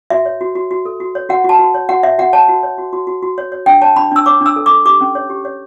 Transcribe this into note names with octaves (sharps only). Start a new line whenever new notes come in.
F#4 E5
C#5
F#4
F#4
F#4
A4
F#4
C#5
F#4 F#5
F#4 A5
F#4
C#5
F#4 F#5
C#5 E5
F#4 F#5
C#5 A5
F#4
C#5
F#4
F#4
F#4
F#4
C#5
C#5
D4 G5
C#5 A5
D4 B5
D4 E6
C#5 D6
D4 E6
A4
D6
A4
G4 D6
C#4
C#5
G4
C#5